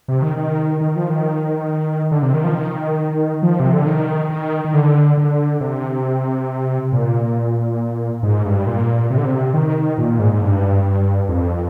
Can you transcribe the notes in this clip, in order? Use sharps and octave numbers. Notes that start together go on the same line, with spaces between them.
C3
D#3
D#3
D#3
F3
D#3
D3
C3
D#3
F3
D#3
F3
C3
D3
D#3
D#3
D#3
D3
D3
C3
A#2
G#2
G2
A#2
C3
D3
C3
D#3
A#2
G#2
G#2
G2
F2